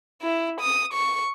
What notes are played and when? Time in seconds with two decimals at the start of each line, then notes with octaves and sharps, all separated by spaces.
0.22 E4
0.61 D#6
0.93 C#6